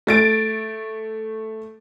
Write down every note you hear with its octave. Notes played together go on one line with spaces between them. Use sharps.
A3 A6 D7